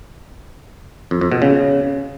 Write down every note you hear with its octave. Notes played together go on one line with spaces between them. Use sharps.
F2
F2
B2
C#3